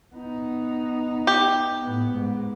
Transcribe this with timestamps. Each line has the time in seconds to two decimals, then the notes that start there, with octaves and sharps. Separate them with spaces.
0.15 B3 D#4
1.27 G4
1.83 A2 B3
2.14 G#2